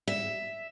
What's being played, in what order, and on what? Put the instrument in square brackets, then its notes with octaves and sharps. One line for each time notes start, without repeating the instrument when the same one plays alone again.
[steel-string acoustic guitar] E5